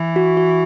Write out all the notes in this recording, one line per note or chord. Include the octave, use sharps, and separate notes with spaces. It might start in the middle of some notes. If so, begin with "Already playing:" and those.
Already playing: E3
F#4
F#4